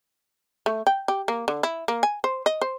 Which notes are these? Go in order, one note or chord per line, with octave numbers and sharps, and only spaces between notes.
A3
G5
G4
A#3
D3
E4
A#3
G#5
C5
D#5
C5